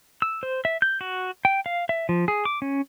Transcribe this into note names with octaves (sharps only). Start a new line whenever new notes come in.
E6
C5
E5
G6
F#4
G5
F5
E5
F3
G#4
D6
C#4